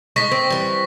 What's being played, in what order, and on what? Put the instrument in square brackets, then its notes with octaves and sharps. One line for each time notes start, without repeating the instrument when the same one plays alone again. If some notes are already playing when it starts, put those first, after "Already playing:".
[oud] G#3 D#4 [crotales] C#6 A#6 B6
[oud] C4
E3 G3